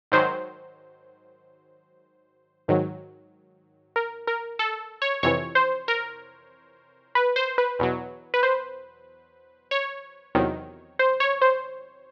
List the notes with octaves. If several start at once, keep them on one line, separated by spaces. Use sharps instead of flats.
G#2 D#3 F#3 C5
G#2 D#3 F#3
A#4
A#4
A4
C#5
F2 C3 E3 C#5
C5
A#4
B4
C5
B4
E2 B2 F#3
B4
C5
C#5
E2 C3 D#3 F#3
C5
C#5
C5